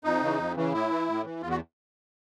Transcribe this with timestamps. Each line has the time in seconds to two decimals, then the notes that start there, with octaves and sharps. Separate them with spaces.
0.04 F2 D#4
0.22 C#3 E3
0.38 F2
0.56 C#3 E3
0.73 A2 E4
0.91 E3
1.08 A2
1.25 E3
1.42 E2 F4
1.50 F#4